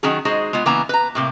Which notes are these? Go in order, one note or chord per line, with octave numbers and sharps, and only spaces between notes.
D#3 F#3 C#4 G#4
G#3 D#4 F#4 G#4 C5
G#3 B3 F4
C#3 E3 A#3 B3 G#5 A#5
B4 A#5
A2 C3 A#3